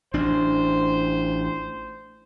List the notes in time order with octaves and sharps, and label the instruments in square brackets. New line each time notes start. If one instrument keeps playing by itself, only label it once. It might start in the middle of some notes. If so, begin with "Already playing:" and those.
[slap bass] A1 D4 [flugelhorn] C5